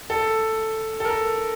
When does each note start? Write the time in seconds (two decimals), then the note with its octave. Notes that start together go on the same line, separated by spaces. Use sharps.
0.10 A4
1.00 A4
1.05 A#4